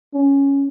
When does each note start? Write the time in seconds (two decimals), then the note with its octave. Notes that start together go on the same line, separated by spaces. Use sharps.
0.14 C#4